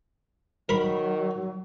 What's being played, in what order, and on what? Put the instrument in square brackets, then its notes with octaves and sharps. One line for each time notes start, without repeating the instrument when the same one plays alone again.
[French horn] D#3 [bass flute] F#3 [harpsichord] A#4 B5